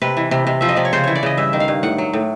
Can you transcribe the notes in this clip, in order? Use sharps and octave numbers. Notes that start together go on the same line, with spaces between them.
C3 B4
E3
C3
C3
F3 E5
D#5
C3 D5
C#5
C#3 C5
E3 C#5
D5
C#3 D#5
G2 E5
D#3
F5
G2
A2 F#5
F#3
A2